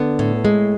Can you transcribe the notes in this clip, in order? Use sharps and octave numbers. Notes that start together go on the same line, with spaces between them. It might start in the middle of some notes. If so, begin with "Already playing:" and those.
Already playing: D3 B3
A2
G#3